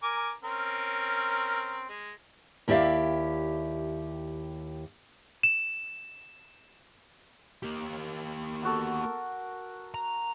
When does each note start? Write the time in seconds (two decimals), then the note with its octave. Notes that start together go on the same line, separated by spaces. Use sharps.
0.03 A#4 G#5 D6
0.44 C4 C#4 A#4
1.89 G#3
2.68 D#2 E4 G4 D5 E5 F5
5.43 E7
7.63 A#3 G4
8.63 B3 F#4 A4
9.01 A#4 A5
9.94 A#5